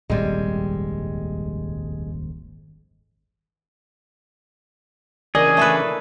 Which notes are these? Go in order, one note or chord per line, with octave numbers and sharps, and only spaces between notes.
D#1 G#1 F2 G3 G#3
C#3 E3 D4 G#4 A#4 D5 D#5
A3 A4 B4